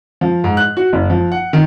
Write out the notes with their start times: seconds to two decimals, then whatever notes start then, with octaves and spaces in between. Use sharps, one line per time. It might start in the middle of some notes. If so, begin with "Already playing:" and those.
0.21 F3
0.44 G#2
0.57 F#6
0.77 F#4
0.93 F#1
1.10 F3
1.32 F#5
1.53 D#3